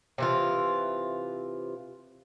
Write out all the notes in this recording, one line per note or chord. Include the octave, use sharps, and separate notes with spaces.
C3 E3 F4